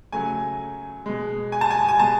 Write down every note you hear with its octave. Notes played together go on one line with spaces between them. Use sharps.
C#3 F#3 A3 G#5
B2 G#3
G#5
A5
G#5
G#5
B2 G#3 A5